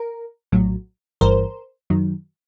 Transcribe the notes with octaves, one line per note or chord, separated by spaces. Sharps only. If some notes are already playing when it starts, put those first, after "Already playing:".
Already playing: A#4
A#1 A2 F#3
G1 G2 E3 A#4 C5
F#2 D#3 F#3